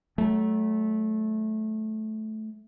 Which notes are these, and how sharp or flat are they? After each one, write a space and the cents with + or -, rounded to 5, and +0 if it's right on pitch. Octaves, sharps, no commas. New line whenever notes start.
F#3 +30 A3 -15